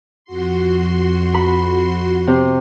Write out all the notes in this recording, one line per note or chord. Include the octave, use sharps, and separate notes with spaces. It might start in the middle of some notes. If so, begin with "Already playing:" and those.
F2 F#4 C6
B5
C3